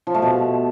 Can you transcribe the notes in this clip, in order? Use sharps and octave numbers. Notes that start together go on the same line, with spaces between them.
F3
A3
B2